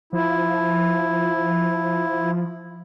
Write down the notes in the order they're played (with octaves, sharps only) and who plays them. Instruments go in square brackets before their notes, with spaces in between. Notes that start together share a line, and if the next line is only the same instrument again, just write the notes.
[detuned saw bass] F3 [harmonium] E4